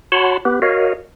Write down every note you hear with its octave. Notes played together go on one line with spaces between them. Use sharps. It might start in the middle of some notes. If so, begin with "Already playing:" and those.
F#4 C#5 F#5 A5 B5 C6
B3 G4 B4
F#4 A#4 C#5 D#5 F5